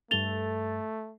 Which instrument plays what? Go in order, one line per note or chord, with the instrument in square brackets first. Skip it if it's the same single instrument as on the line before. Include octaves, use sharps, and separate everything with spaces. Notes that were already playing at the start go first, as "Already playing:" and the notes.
[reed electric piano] G2 A4 A6 [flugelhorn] A3 [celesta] F7 G7